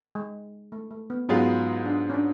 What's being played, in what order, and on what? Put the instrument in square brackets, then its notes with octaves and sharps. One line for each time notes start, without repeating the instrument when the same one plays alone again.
[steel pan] G#3
A3
A3
B3
[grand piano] G#2 F#3 B3 F4 G#4 [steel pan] C#4
[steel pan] D4
C#4
D4